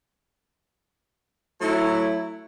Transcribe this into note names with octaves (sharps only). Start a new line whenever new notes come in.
F#3 A3 E4